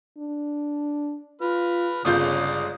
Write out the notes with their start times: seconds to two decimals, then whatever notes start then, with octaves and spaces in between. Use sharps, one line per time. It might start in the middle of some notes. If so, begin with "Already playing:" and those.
0.18 D4
1.41 F4 B4 F6
2.05 G1 C#3 G#3 F4 D5 D#6 G6